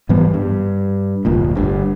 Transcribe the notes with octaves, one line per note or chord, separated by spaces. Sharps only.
G#2 E3 G3 B3
G2
F1 D2 A#2
G1 G2